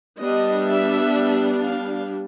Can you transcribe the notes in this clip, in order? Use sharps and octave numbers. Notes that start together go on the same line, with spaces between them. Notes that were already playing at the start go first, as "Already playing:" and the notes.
G3 B3 D4 D#5
E5
F5